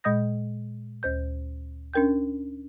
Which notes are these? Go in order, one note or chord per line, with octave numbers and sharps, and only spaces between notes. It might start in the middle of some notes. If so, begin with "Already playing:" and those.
A#2 G#3 D#5 D#6 G6 A#6
D2 C5 G6
C#4 D4 A#4 G5 G6